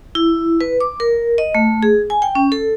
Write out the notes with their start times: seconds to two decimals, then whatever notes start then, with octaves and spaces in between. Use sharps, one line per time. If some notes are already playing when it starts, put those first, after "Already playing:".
0.15 E4
0.61 B4
0.80 D6
1.00 A#4
1.38 D#5
1.55 A3
1.83 G#4
2.10 G#5
2.22 G5
2.35 C#4
2.52 A4